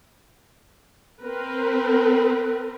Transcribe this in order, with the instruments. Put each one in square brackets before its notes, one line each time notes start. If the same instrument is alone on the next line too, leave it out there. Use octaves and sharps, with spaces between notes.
[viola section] C4 A#4 B4